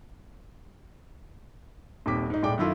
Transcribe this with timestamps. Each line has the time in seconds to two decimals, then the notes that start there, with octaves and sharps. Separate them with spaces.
2.06 D#1 D#2 C3 D6 B6
2.30 G#2 D#4
2.43 D#1 A2 G#3 D5 G5 D6
2.58 F#2 D#3 E4 F4 A4